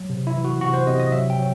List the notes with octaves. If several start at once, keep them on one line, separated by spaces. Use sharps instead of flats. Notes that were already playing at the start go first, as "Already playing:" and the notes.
Already playing: F#3
C3
E4
E3
F#4
C3 F#4
C5
C3 D#5
D#5
F#3 E5
G5
F#3